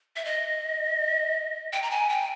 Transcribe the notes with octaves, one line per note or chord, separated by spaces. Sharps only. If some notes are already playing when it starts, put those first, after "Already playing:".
E5
D#5
G5
A#5
G#5
G5